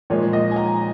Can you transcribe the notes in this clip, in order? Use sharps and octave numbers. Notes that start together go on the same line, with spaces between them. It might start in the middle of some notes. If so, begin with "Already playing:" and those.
A#2 F3 G#3 C#5
D#5
G#5
A#5